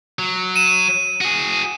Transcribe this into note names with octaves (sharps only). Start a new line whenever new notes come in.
F#3
D#7 E7
F#4 G#4